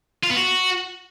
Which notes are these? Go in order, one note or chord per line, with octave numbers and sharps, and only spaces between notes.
F4
B3
F#4